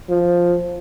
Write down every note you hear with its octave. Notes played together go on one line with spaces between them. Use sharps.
F3